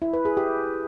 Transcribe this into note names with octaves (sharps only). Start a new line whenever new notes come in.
E4
B4
G#4
G4